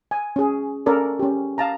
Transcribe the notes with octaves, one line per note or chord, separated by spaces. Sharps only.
G#5
C#4 G#4
C#4 A4 A#4 D5
C#4 G4
F5 A5 A#5